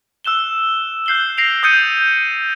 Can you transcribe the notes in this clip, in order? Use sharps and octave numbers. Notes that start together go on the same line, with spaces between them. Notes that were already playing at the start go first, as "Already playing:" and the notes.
E6 F#6 E7 G7
F#6 G6 C7 F#7 G7
A#6 C7 D7 F7
D#6 F#6 G6 A6 C#7 D#7